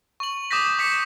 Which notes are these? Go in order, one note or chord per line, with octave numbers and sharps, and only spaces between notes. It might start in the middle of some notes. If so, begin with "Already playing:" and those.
C#6 F#7
D6 D#6 G6 A#6 B6
D6 B6 C#7 E7